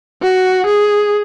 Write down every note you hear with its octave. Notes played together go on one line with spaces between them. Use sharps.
F#4
G#4